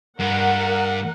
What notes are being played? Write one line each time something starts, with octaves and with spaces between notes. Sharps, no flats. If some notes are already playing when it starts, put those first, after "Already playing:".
G2 A#4 F#5